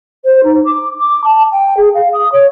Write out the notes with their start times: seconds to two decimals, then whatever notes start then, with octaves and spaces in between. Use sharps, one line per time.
0.25 C5
0.43 D#4
0.65 D6
0.99 D6
1.24 A5
1.52 G5
1.77 G#4
1.94 F5
2.13 D#6
2.32 C#5